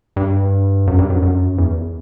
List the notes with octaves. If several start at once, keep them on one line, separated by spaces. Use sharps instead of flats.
G2
F#2
G2
F#2
F#2
E2